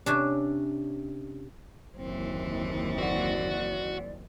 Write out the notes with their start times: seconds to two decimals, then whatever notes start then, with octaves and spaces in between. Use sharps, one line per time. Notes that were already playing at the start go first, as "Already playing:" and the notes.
0.06 C3 C#4 D4
1.97 F#1 D#2 E3 C4
2.98 F#4 D5 F#5